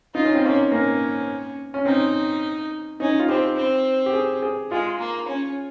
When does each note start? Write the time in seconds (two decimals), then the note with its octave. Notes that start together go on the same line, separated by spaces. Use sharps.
0.15 D#4 F4
0.25 C#4
0.35 C4
0.43 A#3 C#4
0.71 A#3 C#4
1.74 C#4
1.85 C4 D#4
3.00 C#4 D#4
3.19 F4
3.29 C4 G4
3.56 C4
4.06 G4
4.14 G#4
4.42 G#4
4.71 G#3 F4
4.99 A#3
5.28 C#4